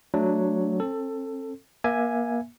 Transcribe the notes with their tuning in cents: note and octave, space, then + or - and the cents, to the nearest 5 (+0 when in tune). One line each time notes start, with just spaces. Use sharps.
F#3 +0 A3 +0 D4 +0
C4 +40 A4 +15
A#3 +30 E5 +0 G#5 +0